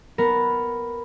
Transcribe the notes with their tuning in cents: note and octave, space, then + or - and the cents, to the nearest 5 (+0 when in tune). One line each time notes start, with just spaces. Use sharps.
B3 +0 A#4 +0